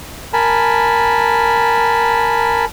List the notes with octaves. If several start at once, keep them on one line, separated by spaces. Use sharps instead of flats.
A#4 G#5 A5 B5